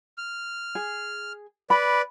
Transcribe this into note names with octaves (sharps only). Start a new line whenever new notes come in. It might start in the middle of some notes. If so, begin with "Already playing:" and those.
F6
G#4
B4 D5 B5